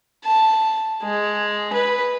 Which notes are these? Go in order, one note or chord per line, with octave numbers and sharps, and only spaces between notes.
A5
G#3
B4